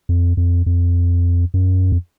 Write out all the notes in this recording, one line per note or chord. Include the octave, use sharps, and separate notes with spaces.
F2
F2
F2
F#2
F2